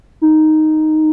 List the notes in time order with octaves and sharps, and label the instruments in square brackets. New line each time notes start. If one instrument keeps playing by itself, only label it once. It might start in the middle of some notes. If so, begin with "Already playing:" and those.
[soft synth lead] D#4